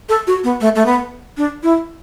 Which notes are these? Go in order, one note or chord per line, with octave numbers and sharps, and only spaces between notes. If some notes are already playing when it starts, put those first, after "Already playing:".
A4
F#4
B3
A3
A3
B3
D4
E4